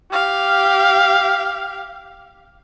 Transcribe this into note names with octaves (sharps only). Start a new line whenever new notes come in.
G4 F5